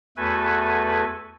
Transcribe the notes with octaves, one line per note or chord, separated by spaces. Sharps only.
E2 A3 F#4 A4 B4 G#5